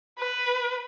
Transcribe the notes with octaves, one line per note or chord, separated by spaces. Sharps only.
B4